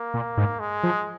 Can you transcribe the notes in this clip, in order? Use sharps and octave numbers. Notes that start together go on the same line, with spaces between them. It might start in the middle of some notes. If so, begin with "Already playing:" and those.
Already playing: A#3
A#2
G#2
G#3
F3